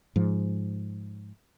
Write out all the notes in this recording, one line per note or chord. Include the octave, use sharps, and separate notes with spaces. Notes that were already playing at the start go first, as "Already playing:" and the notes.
G#2 F3